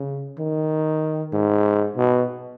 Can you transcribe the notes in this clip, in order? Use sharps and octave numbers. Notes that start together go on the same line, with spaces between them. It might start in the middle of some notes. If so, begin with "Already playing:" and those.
Already playing: C#3
D#3
G#2
B2